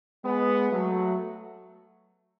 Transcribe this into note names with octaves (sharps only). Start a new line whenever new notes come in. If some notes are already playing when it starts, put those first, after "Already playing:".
G#3 B3
F#3 A3